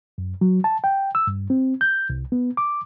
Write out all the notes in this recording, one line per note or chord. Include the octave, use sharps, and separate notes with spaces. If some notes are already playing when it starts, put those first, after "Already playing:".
F#2
F#3
A5
G5
E6
G2
C4
G6
C2
B3
D6